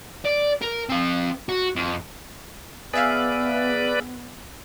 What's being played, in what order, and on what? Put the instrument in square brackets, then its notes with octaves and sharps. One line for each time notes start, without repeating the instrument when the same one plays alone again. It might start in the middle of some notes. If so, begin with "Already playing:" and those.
[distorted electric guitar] D5
A#4
C4 F5
F#4
F2
[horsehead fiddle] B3 [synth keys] G#4 E5 F5 [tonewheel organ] B4 D5